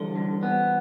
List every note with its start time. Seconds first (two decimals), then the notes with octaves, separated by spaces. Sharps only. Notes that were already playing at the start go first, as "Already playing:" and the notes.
Already playing: D3 E3 G3
0.16 G2
0.43 B3